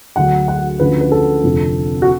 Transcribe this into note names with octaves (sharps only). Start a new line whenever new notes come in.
D2 D3 F#3 F#5
F#5
D2 C#3 F3 B4
B4
A4
F1 F2 D3
F#4